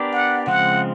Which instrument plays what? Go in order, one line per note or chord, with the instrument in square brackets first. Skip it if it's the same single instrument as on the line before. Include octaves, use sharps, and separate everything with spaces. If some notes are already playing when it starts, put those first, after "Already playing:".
Already playing: [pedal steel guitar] B3 D4 G4 A#4 D5
[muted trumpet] F#5
[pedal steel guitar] C#3 F3 G#3 C4 [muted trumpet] F#5